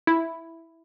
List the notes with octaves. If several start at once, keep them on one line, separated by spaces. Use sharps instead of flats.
E4